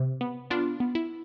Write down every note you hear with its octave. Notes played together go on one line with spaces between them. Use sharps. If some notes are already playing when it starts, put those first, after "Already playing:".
Already playing: C3
B3
B3 D4 F4
B3
E4